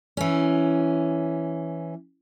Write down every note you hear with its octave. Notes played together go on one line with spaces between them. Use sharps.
E3 C#4